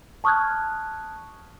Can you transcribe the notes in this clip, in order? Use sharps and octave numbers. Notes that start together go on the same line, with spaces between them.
A5 C#6 D#6 F6 F#6 G#6